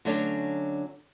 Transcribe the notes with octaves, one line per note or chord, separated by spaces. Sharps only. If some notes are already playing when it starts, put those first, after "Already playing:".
D3 F#3 A3 C#4 D4